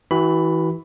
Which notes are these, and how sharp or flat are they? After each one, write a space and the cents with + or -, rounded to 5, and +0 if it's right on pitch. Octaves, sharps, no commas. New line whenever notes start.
E3 -20 F#4 +25 B5 +10